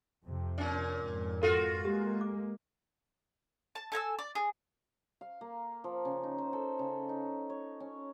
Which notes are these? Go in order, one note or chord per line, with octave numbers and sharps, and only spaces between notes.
F2 C3
A#2 C#4
F2 G#2
F4 F#4 A4
G#3 A#3 G4
D6
A5
A4 G#5 A#5 E6
D5
G#4
F5
A#3
F3
C#3
D#4
C5
A4
C#3
D#4
C#5
C#4